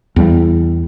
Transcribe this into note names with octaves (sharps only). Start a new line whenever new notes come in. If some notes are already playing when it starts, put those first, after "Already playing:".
E2 G3